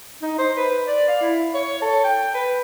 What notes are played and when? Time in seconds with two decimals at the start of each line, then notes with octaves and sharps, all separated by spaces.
0.22 D#4
0.38 C5
0.57 B4
0.88 D5
1.08 F5
1.22 E4
1.54 C#5
1.82 A4
2.04 G5
2.34 B4